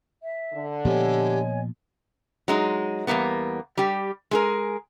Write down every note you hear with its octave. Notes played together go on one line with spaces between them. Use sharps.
E5
D3
A#2 F3 B3 G4 C#5 D#5 G#5
F#3 G#3 D#4
E2 C3 G3 A#3 B3
G3 G4
G#3 G#4 A#4